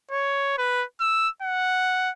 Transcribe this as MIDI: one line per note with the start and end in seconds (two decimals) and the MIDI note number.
0.11 0.54 73
0.58 0.84 71
1.00 1.28 88
1.42 2.10 78